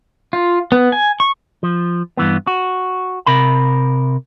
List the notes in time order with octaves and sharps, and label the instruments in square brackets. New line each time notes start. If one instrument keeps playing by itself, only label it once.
[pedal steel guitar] F4
B3
G#5
C#6
[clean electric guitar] F3
G2 E3 B3
F#4
C3 A#4 B5